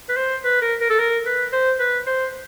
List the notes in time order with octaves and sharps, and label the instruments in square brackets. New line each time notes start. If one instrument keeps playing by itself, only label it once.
[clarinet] B4
C5
B4
A#4
A#4
A4
A#4
B4
C5
B4
C5